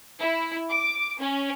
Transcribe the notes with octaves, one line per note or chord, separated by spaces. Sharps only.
E4
D6
C#4